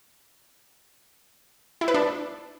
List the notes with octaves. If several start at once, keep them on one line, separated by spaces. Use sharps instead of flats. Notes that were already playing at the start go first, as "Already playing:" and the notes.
E4
B4
D4